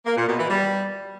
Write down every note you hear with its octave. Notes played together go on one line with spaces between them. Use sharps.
A#3
A#2
B2
E3
G3